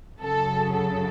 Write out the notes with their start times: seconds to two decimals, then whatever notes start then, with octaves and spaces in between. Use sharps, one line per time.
0.20 F#2 C#3 F#3 A4
0.72 A4